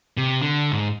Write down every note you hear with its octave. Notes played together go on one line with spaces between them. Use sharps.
C3
D3
G#2